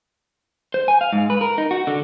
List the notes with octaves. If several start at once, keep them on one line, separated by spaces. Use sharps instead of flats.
C5
G#5
F5
G#2
B4
A#4
D#4
F#4
D3